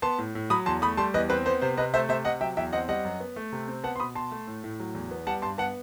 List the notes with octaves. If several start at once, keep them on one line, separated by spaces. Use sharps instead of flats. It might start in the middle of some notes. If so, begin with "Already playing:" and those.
B3 A5 C6
A2
A2
F#3 B5 D#6
E2 A5 C6
A3 B5 D#6
G3 A5 C6
E2 B4 D#5
C4 B4
B3 C5
C3 C5
C3 B4 D#5
A3 C5 E5
C3 C5 E5
C3 D#5 F#5
F#3 E5 G5
E2 E5 G5
C4 D#5 F#5
G3 D#5 F#5
F#2
B3
A3
C3
C4
B3 F#5 A5
C6
B2 B5 D#6
B2 A5 C6
A3
A2
A2
F#3
E2
B3
G3 F#5 A5
G2 A5 C6
B3 F#5 A5